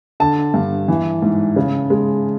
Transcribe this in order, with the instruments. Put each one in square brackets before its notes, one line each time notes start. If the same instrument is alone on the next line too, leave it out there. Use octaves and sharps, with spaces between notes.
[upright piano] D3 A5
G2
E3
G#2
C#3
G#3